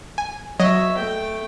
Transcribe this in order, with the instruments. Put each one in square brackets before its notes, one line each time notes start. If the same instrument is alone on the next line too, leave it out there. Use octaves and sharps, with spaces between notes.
[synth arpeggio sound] G#5
[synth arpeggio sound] F#3 D#5 [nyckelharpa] C#5 E5
[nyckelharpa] A3 G5